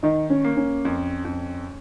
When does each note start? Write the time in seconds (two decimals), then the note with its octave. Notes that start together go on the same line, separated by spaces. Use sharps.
0.03 D#3 D#4
0.30 C#4
0.44 A#3
0.57 C#4
0.85 F2
1.25 F2